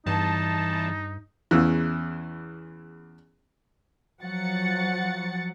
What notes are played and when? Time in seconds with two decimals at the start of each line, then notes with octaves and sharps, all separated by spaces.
0.06 E2 G2 E3 D#4 A5
1.51 E2 C#3 E3
4.21 F3 F#3 F#5 A6 C#7